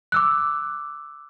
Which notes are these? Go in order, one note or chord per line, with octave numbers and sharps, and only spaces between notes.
D6 E6 F#6